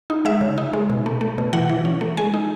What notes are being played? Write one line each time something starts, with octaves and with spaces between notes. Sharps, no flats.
D#4
G#3 E5
C#3
D#4
G#3
B2
A3
A3
B2
E3 F#5
E3
C#4
A3
G#3 G#5
D#4